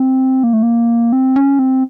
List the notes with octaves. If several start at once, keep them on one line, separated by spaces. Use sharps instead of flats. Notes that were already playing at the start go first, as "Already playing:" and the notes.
Already playing: C4
A#3
A3
A#3
C4
C#4
C4